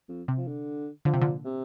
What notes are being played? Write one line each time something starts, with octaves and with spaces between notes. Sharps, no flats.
F2
C3
F3
D3
D3 F3
C3
A#2 D3
C3